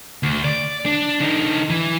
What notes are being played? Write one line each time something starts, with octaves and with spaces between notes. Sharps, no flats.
D2
D5
D4
D3 D#4
E3